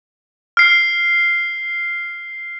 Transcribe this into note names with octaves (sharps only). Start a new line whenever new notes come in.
F6 C7